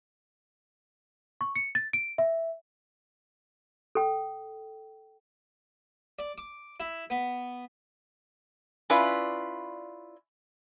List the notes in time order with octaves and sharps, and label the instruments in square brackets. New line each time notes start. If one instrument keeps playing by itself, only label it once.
[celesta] C#6
C#7
A6
D7
E5
[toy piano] A4 G5
[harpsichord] D5
D6
E4
B3
[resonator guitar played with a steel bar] C#4 E4 F4 B4 D5